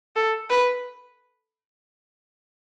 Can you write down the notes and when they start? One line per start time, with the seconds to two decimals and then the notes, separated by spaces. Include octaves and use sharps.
0.16 A4
0.50 B4